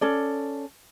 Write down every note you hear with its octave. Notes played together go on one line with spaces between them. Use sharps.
C#4 A4 D5